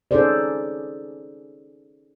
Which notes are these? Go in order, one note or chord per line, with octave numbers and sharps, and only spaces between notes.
C#4 D#4 G#4 A4 C5 D5